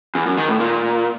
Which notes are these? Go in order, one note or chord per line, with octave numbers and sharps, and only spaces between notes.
E2
F#2
D#3
A2
A#2